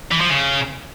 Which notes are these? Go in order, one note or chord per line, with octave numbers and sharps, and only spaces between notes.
E3
F3
C#3